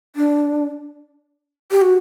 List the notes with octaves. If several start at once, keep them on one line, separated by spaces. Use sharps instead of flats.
D4
G4
F#4